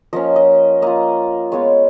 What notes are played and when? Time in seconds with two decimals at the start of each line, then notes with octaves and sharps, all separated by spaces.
0.13 F3 A#3 C#4 D#5
0.36 D#5
0.82 A#3 F4 D#5
1.52 G#3 B3 F4 C#5